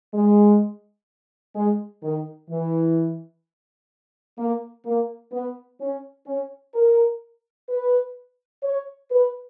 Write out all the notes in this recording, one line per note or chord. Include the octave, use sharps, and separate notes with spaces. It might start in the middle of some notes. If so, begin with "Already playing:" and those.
G#3
G#3
D#3
E3
A#3
A#3
B3
C#4
C#4
A#4
B4
C#5
B4